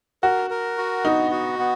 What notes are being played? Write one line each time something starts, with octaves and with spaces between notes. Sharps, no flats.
F#4 A#4
A#4
F#4
B3 D#4
F#4
B3